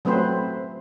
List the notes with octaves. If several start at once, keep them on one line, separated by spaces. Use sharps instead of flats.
F#3 A3 C4 B4 C5